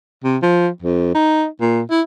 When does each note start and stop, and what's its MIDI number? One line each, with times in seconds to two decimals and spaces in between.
0.24 0.38 48
0.42 0.69 53
0.82 1.14 41
1.15 1.46 63
1.61 1.82 46
1.90 2.01 64